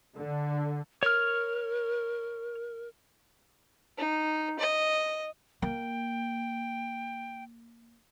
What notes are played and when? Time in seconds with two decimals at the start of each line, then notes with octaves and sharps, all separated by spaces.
0.17 D3
1.03 A#4 C#5 F6
3.98 D#4
4.60 D#5
5.62 A#3 G5